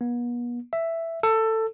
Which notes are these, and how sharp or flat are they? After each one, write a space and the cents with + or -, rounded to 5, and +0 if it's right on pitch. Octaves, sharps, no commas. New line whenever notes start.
B3 -40
E5 +5
A4 +15